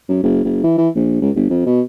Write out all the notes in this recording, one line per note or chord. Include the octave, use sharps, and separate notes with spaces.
F#2
F#1
F#1
E3
E3
A#1
C#2
G1
F2
B2